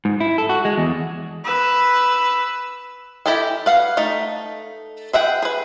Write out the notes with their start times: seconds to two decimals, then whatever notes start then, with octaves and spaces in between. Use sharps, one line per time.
0.05 G#2
0.20 E4
0.38 A4
0.49 F#4
0.65 G#3
0.78 E2
1.45 B4 E6
3.26 E4 G4 A4 D#5 G#5
3.66 B4 F5 F#5
3.97 A3 D#4
5.13 G#4 E5 F#5 G5
5.42 G#4 B4